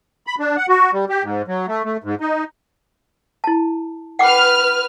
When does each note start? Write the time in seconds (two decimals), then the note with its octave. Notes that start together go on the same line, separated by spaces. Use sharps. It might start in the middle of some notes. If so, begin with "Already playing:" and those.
0.27 B5
0.39 D4
0.57 F#5
0.69 F#4
0.93 G3
1.09 G4
1.23 G#2
1.48 F#3
1.68 A3
1.85 A3
2.04 G#2
2.21 D#4
3.44 E4 A5
4.19 B4 F#5 G5 D6 F6